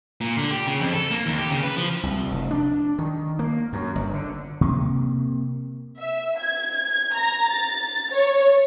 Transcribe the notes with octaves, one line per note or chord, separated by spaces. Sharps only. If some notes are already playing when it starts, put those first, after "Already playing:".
A#2
D3
G4
C#3
F2
A4
A#3
D#2
G4
C#3
B4
F3
C2
F1
D4
D#3
A#3
F#2
G1
D3
C3 A#3
E5
G#6
A#5
A6
C#5